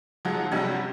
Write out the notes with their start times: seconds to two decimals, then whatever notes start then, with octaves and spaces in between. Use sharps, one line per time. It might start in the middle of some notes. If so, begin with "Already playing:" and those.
0.25 G1 F3 F#3 G#3 D#4 F#5
0.51 G2 C3 G3 G#3 C#4 F#4